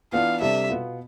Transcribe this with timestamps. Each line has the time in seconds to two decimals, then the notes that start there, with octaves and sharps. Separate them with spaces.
0.12 E3 B3 D4 F4 F5
0.41 C3 G3 D4 A4 E5
0.69 B2 B3 F4